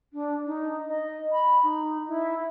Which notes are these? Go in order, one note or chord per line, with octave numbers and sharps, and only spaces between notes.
D4
D#4
D#5
B5
D#4
E4